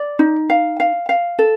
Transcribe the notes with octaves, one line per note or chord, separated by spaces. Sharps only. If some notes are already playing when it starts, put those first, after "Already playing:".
Already playing: D5
D#4
F5
F5
F5
A4